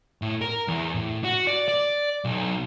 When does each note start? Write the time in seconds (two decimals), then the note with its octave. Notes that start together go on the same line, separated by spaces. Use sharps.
0.22 A2
0.41 A#4
0.68 E2
0.94 A2
1.24 F#4
1.47 D5
1.68 D5
2.25 B1